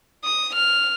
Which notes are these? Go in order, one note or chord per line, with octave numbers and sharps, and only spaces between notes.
D#6
F6